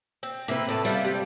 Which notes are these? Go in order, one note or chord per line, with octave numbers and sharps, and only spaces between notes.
C4
C3 A#3 B4 E5
A2 A4 A5
G3 B3 F4 D5 E5
C4 G4